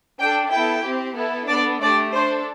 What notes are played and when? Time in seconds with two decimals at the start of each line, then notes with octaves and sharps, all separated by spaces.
0.19 D4 A4 G5
0.51 B3 E4 A4 G5
0.84 C4 G4
1.16 B3 E4 A4
1.48 B3 D4 A4 D5
1.81 A3 D4 G4 D5
2.13 D4 A4 C5